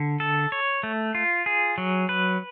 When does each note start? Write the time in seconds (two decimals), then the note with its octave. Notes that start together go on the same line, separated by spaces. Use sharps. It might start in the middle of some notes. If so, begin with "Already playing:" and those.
Already playing: D3
0.20 A4
0.52 C#5
0.83 A3
1.15 F4
1.46 G#4
1.78 F#3
2.09 B4